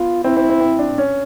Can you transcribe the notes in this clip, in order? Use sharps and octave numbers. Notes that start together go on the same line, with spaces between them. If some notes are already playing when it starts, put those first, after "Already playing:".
Already playing: B3 F4
C4 E4
C4
C4
C4
D4
C#4